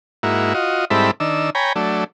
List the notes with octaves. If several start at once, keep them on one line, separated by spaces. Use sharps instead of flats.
G#2 A#3 E4 F#4
F4 F#4 D#5
G#2 G3 C4 E4 A4 B5
D#3 D4 E6
C#5 G5 G#5 A#5 B5
F#3 A3 D4